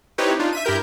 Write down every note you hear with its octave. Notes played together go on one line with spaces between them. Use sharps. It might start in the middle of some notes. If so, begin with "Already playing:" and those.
C4 D#4 E4 G4 B4 C#5
D4 D#4 F4
E5 B6 D#7
G2 E4 G4 A#4 G6